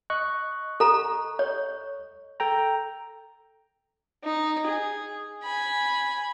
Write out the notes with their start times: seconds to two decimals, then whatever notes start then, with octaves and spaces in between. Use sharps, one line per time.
0.10 D#5 C#6 F#6
0.80 A4 A#5
1.39 C#5
2.40 A4 G5 A#5
4.24 D#4
4.67 G#4
5.43 G#5 B5